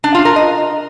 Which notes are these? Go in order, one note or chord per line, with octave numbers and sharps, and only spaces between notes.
D4
F4
A#4
D#5